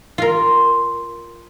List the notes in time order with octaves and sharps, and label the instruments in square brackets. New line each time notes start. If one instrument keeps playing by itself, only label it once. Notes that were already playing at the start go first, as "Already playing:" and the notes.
[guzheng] F4 A#4